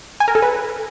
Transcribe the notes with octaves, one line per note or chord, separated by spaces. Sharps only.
G#5
A#4
A4
B4